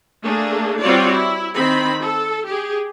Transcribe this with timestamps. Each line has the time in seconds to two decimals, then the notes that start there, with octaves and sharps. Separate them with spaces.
0.23 A3 A#3 D4 G#4
0.80 G3 C4 F4 F#4 C#5 D5
1.11 E4
1.53 D#3 C4 B5
2.01 A4
2.46 G4 G#4